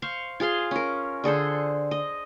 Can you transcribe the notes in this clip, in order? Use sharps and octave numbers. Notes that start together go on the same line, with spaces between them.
C5 F5 C#6
F4 G#4 F5 C6
C#4 A#4
D3 G#4 A4 C5
D#5